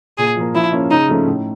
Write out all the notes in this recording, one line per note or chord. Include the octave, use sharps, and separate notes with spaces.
A#2 G#4
F3 A#3
F3 E4
A#3 C#4
C#3 D#4
F3 A3 C#4
A2